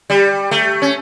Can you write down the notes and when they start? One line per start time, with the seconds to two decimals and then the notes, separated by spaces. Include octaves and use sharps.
0.10 G3
0.51 A3
0.82 C#4